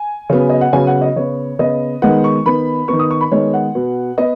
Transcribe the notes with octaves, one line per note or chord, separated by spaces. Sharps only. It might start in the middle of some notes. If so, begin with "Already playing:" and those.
Already playing: G#5
C#3 F#3 B3
D#5
F#5
C#3 F#3 B3 G#5
F#5
D#5
C#3 B3 C#5
C#3 B3 D#5
D#3 G#3 B3 F#5
C#6
D#3 B3 B5
D#3 B3 C#6
D#6
C#6
B5
D#3 G#3 B3 C#5
F#5
B2 B3
B3 D#5